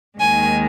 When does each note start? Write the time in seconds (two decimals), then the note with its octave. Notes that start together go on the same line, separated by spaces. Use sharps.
0.19 D#2 D#3 G#3 G#5